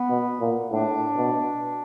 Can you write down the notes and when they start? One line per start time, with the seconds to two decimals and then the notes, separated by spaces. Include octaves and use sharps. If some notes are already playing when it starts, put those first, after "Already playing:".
Already playing: B3
0.10 B2
0.40 A#2
0.71 A2 D4
1.17 B2